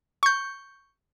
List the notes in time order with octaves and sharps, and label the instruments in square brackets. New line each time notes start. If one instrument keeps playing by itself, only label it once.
[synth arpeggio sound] C#6 G6